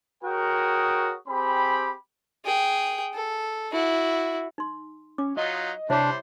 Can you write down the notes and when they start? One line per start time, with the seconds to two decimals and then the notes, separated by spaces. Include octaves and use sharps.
0.24 F#4 G#4 A#4 C#5 G5 D#6
1.28 C4 G4 G#4 B5
2.45 G#4 G5
3.14 A4
3.73 E4 F#4
4.58 D#4 C6
5.18 C#4 D6
5.37 F#3 D#4 F4 D#5
5.90 C3 G3 D4 E4 C5 C#5 E5